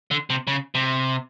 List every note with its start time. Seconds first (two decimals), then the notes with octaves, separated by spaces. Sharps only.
0.11 D3
0.30 C3
0.47 C#3
0.75 C3